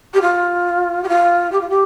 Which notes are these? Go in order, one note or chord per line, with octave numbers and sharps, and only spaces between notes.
G4
F4
G4
F4
G4
F4
G4